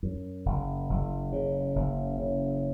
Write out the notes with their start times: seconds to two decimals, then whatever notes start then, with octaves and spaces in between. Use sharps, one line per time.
0.03 F#2
0.46 F#1
0.89 F#1
1.33 C#3
1.75 F#1
2.19 C#3